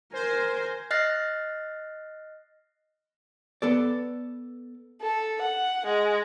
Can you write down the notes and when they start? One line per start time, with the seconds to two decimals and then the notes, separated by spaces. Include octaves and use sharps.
0.13 A#4 C5 G#5
0.91 D#5 F6 F#6 A6 A#6 C7
3.62 B3 A4 D5
5.02 A4
5.42 F#5
5.86 G#3